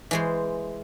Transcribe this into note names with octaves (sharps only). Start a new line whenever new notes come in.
E3 G#3 C5